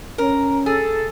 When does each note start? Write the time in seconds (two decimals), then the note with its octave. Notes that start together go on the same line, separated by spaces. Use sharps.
0.18 C#4 A#4
0.66 G#4 A4